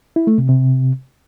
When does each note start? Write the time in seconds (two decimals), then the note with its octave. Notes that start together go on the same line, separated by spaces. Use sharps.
0.16 E4
0.27 A3
0.38 C3
0.49 C3